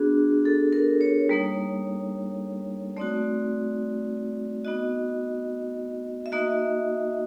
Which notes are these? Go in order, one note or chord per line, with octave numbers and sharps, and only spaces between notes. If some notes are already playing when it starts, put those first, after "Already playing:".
Already playing: B3 D4 F#4 G#4
A4
A#4
C#5
G3 A#3 D#4
A3 C4 D#4 F#4 D5
B3 D#4 F#4 D#5
E5
A#3 D#4 F#4 D#5